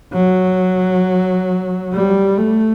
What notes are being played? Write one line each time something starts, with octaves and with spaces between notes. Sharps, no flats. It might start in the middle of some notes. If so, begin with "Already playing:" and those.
F#3
G3
A3